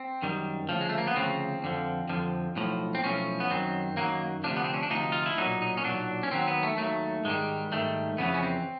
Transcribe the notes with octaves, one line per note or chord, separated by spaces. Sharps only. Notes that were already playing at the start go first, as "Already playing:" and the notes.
Already playing: C4
F#2 D#3 G3
D2 C#3 F3
G#3
A3
A#3
B3
D2 C#3 F3 C4
F2 D3 F3
F2 D3 F3
B1 A2 F3
C4
B1 A2 F3 C#4
B3
F#2 D#3 F#3 C4
F#2 D#3 F#3 A#3
D2 C3 F3 D4
B3
C4
C#4
D4
D2 C3 F3 D#4
F4
E4
B1 A#2 F#3 D#4
D#4
C#4
B1 A#2 F#3 D4
C#4
D#2 D#3 F#3 C4
B3
A3
D#2 D#3 F#3 A3
G#2 D#3 G3 G#3
G#2 D#3 G3 A3
F2 C#3 E3 B3
C#4
C4